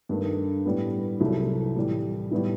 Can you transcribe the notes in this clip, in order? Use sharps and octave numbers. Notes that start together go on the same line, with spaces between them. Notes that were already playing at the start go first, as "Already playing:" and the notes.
G2 D#3 A3
A2 G3 B3
C2 C3 F#3 A3 E4
A2 E3 G3
A2 G3 B3 E4